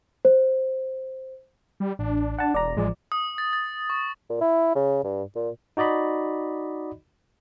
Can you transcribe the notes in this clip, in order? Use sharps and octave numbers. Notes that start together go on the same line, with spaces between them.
C5
G3
A1 D4
F#5 A5
E1 D5 A#5
A1 F3 G#3 D5
D#6
A6
A6
C#6
A#2
E4
C#3
G2
A#2
D#4 F#4 D5 D#5 B5